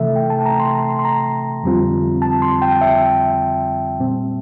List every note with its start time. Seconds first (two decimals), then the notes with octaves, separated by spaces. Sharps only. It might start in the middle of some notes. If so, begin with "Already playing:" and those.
Already playing: C3 E3 A3 A4 E5
0.16 G5
0.30 A5
0.46 A#5
0.60 C6
0.75 A#5
0.89 C6
0.99 C6
1.05 A#5
1.63 F2 D3 G3 C4 F4
2.22 A5
2.42 C6
2.62 G5
2.81 E5
4.00 A#2 G3 C4